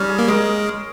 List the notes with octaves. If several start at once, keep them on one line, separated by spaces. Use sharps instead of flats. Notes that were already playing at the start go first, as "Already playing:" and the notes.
Already playing: G3 C#4 D#4
G#4
A#3
G#3 A#4